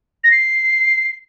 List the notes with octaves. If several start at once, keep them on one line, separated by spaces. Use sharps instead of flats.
A#6
C7